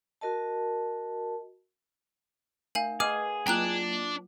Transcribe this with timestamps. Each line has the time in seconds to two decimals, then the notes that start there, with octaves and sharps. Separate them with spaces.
0.21 F#4 A#4 D#5 A5
2.75 A3 A#4 F5 G#5 F#7
3.00 G#4 B4 D#5 F#5 D6 F6
3.47 F#3 A#3 D4 F4 G5 A#5 F#6